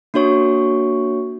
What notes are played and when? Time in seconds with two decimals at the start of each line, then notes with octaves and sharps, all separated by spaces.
0.14 A#3 D4 F#4 C#5 C#6